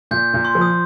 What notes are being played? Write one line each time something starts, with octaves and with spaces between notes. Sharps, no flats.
A#2 G6
A#2
C6
F3
D#6